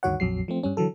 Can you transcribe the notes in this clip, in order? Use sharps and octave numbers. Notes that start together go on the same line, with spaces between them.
D2 G2 D#3 F#4 C#5 F#5
A#1 F2 F#3 C7
F3 A3 C4
G2 G3 C#4
D3 E3 F#3 A4